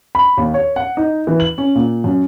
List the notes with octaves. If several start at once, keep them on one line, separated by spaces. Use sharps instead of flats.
B5
D#2
C#5
F#5
D#4
E3
F#7
C#4
A#2
F#2